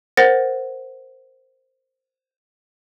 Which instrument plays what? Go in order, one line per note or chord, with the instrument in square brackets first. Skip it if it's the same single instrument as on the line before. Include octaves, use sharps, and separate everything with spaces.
[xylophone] A#4 C5 F#5 A6 A#6